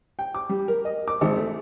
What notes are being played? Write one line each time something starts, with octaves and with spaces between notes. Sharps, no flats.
G5
D6
G3
A#4
D#5
D6
G#1
A3